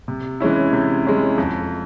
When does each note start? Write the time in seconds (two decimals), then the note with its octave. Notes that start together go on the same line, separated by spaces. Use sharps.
0.08 C3
0.40 E3 G#3 C#4 E4
0.73 C3
1.05 E3 G#3 C#4 E4
1.38 F2